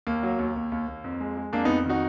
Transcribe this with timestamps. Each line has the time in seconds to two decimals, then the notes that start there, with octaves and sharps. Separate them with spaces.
0.07 D#2 A#3
0.23 F#3
0.39 D#2
0.56 D#2
0.72 D#2
0.88 D#2
1.04 F2
1.20 G#3
1.37 G#3
1.53 F2 A#3 D4
1.65 F2 B3 D#4
1.86 D#3 D#4 F#4